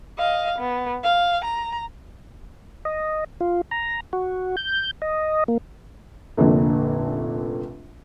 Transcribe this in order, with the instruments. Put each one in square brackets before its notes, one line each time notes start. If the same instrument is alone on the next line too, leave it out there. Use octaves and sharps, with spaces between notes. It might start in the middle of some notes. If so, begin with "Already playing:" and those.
[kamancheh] D#5 F5
B3
F5
A#5
[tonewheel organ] D#5
F4
A#5
F#4
G6
D#5
A#3
[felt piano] F1 A#1 A#2 D3